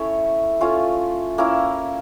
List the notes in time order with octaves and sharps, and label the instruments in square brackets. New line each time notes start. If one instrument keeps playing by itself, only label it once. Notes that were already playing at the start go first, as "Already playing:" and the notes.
Already playing: [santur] A3 C#4 E4 C#5 E5
A3 C#4 F4
A#3 C#4 E4